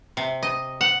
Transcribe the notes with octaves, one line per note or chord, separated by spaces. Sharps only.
C3
D#5
F#5